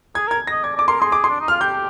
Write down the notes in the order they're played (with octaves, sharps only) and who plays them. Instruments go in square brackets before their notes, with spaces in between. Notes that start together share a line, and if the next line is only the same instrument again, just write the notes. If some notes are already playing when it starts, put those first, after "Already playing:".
[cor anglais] G#4 [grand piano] G#6
[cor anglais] A#4 [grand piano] G#6
[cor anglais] D#5 [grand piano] A#6
[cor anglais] D5 [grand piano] G#6
[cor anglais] D5 [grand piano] D6
[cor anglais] A#4 [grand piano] C6
[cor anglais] G#4 [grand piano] C6
[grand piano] D6
C6
[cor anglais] D4
D#4
[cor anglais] F4 [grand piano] F6
[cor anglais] G4 [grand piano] G6